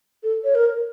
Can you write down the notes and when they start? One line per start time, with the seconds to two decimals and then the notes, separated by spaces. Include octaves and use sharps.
0.23 A4
0.44 C#5
0.55 A#4